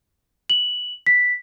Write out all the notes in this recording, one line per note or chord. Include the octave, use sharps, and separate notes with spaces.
F#7
B6